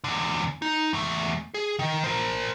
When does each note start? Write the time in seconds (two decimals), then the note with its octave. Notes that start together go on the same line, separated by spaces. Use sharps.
0.04 E2 D3
0.62 D#4
0.93 E2 A3
1.54 G#4
1.79 D#3
2.04 A#4 C5